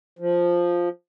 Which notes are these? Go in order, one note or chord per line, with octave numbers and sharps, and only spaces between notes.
F3